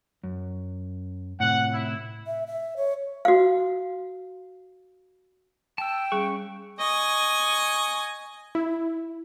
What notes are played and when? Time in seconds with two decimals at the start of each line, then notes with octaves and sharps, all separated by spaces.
0.23 F#2
1.40 A2 C3 F#5
1.74 E4
2.27 E5
2.47 E5
2.77 C#5
3.25 F#4 F5
5.78 G5 A5 E6
6.12 G3 C#4 G#4 C#6
6.79 D#5 G#5 C#6
8.55 E4